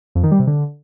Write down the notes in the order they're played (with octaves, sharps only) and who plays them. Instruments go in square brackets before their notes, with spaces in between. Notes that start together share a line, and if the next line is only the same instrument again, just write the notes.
[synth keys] F2
D#3
G3
C3
D3